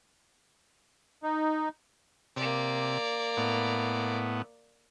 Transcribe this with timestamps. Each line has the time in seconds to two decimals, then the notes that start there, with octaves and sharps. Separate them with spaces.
1.23 D#4
2.36 C3 A#3 D5
3.37 A2 B3